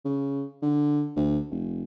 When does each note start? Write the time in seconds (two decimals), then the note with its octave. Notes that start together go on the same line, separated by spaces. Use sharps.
0.05 C#3
0.62 D3
1.16 D2
1.51 F1